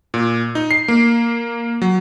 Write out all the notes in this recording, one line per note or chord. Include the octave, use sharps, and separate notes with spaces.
A#2
D#4
C7
A#3
F#3